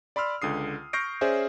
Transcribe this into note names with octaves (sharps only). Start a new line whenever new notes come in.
D5 B5 C6 E6 F6
C#2 D3 D#6 C7
C#6 F6 G6 A#6 C7 D7
C#4 G#4 C5 D5 E5